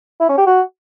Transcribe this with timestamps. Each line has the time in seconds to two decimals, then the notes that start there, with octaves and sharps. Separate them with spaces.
0.20 E4
0.29 C#4
0.38 G4
0.47 F#4